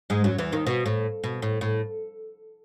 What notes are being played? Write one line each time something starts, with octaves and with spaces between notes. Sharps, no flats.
G#2 G#3
F#2 F#3
E2 E3
D#2 D#3
B2
A2
B2
A2
A2